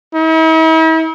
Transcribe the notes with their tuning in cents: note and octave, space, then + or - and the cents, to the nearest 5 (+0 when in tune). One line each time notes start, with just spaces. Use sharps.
E4 -45